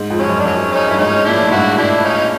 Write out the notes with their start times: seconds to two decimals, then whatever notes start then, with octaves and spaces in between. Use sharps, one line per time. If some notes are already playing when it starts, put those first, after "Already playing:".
Already playing: G#2
0.10 F2
0.18 F#3 C#4
0.28 F#2
0.40 D4
0.45 F#2 F#3 C#4
0.71 C#4 D#4
0.88 G2 E4
0.98 G#2 C#4 D#4
1.24 A#2 D4 E4
1.34 A2
1.43 G#2
1.51 G2 E4 F#4
1.77 D4 E4
2.04 C#4 D#4